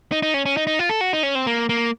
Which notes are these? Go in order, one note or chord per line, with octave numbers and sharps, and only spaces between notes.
D#4
D#4
C#4
C#4
D#4
D#4
F4
A4
F#4
D#4
C#4
C4
A#3
A#3